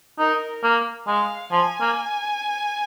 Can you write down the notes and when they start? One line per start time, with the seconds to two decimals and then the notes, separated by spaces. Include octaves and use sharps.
0.19 D#4 A#4
0.63 A#3
1.07 G#3 F5
1.52 F3 G#5
1.81 A#3